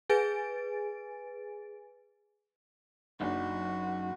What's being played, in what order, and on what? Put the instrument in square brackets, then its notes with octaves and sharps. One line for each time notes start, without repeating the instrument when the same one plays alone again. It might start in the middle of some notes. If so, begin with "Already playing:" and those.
[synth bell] G#4 B4 G#5 A6 D7
[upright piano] F#1 D4 [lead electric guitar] F#2 D#4 [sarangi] F#4